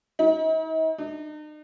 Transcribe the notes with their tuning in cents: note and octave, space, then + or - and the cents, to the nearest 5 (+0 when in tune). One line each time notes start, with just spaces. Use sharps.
D#4 +45
D#4 -45